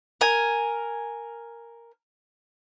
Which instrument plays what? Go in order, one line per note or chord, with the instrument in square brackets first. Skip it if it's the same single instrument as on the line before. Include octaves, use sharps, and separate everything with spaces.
[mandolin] A#4 G#5